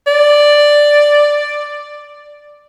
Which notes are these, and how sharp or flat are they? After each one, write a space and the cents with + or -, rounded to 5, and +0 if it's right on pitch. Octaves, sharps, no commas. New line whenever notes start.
D5 +5